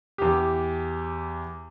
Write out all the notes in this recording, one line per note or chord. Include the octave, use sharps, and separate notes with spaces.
E2 G4